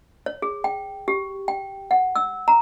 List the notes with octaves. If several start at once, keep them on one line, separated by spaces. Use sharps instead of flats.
C#5
G#4
G5
G4
G5
F#5
E6
A#5